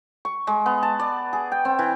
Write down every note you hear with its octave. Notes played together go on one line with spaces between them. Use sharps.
C#6
G#3
B3
A5
D5
G#4
G5
C4
E3